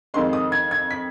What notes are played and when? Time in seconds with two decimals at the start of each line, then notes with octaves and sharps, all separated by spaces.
0.14 F2 D#3 G#3 C6
0.33 D#6
0.52 G#6
0.71 G#6
0.91 B6